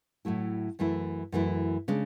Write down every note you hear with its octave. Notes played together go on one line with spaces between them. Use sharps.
A2 F#3 A3 E4
F#2 E3 A3 E4
F#2 E3 A3 E4
C#3 G#3 D4